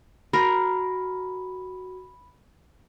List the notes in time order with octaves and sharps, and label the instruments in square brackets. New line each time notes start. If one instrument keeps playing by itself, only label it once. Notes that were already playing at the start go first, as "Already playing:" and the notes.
[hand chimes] F#4 [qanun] A#4 [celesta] B5